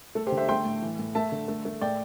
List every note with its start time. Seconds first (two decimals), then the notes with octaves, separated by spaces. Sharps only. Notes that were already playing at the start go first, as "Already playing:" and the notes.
0.15 A3 A4
0.27 G4 C5
0.32 D3
0.37 C5 E5
0.49 A3 G5 C6
0.65 A2
0.82 E3
0.99 A2
1.15 A3 E5 A5
1.32 D3
1.48 A3
1.65 A3
1.81 A2 D5 G5